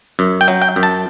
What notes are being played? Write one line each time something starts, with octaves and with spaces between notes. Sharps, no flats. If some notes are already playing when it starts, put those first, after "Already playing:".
F#2
G5
F#3
G5
F#2
A5